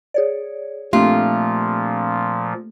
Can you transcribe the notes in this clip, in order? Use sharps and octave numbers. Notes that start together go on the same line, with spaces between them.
G#4 C#5 D5
A#2 F3 A3 A#3 C4 D4 F4 G4